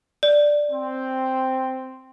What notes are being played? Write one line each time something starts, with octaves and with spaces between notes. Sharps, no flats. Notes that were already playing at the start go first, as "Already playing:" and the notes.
D5
C4